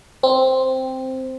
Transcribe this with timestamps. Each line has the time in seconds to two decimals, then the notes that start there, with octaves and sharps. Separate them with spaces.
0.23 C4